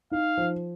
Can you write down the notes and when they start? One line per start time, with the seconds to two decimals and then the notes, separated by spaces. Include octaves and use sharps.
0.12 D#4 F5
0.37 F3